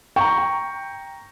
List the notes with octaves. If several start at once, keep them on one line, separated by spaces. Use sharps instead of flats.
G5 A#5 C#6